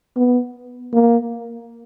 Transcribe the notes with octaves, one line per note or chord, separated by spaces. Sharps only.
B3
A#3